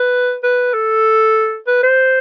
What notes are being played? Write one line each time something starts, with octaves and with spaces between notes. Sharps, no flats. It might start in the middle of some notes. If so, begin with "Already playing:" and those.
Already playing: B4
B4
A4
B4
C5